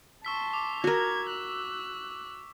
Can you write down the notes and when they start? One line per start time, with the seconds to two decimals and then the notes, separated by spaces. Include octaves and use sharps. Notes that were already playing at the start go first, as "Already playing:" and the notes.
0.25 A5 C6 C#6 E6 B6
0.53 D6
0.84 F#4 A#4 G#6
1.28 E6 F#6